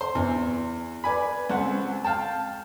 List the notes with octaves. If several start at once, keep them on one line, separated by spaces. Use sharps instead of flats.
C5
E2
B4 D5 G#5 B5
C#2 C4 F#5
F5 G5 A5